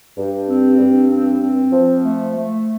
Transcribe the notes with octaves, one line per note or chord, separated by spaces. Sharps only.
G2
C4
G2
C4
C4
F3
A3
A3